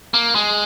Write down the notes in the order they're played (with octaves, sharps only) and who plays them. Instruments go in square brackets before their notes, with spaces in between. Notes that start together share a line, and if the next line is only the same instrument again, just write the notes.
[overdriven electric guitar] A#3
G#3